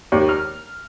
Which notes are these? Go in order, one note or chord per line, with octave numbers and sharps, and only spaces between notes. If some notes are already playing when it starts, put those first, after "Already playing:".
D#2
F6